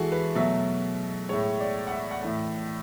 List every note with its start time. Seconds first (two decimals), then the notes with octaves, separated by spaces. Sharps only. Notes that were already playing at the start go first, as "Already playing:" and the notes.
Already playing: E3 G#3 F#4 G#4 A4
0.12 B4
0.35 B2 F#3 A3 E5
1.29 A2 G#3 C#5
1.60 D5
1.87 F#5
1.91 E5
2.11 F#5
2.22 A2 E3 A3 E5